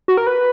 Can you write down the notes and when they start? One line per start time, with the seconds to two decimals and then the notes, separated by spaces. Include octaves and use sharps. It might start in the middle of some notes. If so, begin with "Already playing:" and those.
0.08 F#4
0.17 A#4
0.27 B4